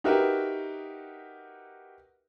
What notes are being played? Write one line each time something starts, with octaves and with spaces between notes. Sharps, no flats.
D#4 F#4 G4 A#4 B4 E5